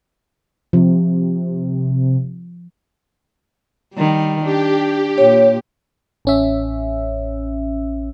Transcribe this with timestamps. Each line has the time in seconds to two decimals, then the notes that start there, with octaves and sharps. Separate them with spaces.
0.73 C3 F3
3.94 D#3 G3
4.44 D4 G4
5.18 A#2 C#5
6.25 A1 C#4 E5